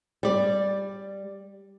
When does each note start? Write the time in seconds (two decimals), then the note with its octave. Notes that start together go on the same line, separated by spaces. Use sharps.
0.23 G3 D5